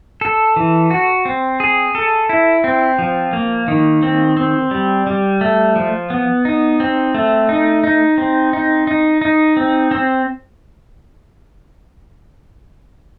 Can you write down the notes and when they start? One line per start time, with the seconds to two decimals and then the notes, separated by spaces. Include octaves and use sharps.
0.21 A4
0.56 E3
0.91 F#4
1.25 C4
1.60 G#4
1.95 A4
2.29 E4
2.64 C4
2.99 F3
3.33 A#3
3.68 D#3
4.03 C4
4.37 C4
4.71 G3
5.07 G3
5.41 A3
5.76 F3
6.10 B3
6.45 D#4
6.80 C4
7.15 A3
7.49 D#4
7.84 D#4
8.18 C4
8.53 D#4
8.87 D#4
9.21 D#4
9.57 C4
9.91 C4